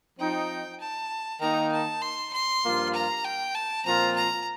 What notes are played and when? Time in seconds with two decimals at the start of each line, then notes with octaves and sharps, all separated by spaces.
0.19 F3 C4 D#4 G5
0.80 A5
1.41 D#3 A#3 D#4 A#5
1.72 A5
2.02 C6
2.33 C6
2.64 G2 F3 A#3 F4
2.94 A#5
3.24 G5
3.55 A5
3.85 A#2 F3 C4 F4 A#5
4.16 A#5